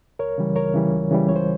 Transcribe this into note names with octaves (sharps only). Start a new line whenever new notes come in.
C#2 A#4 C#5
C#3 E3 G3
C#2 A#4 C#5
C#3 E3 G3
C#2
C#3 E3 G3
C#2 C#5
C5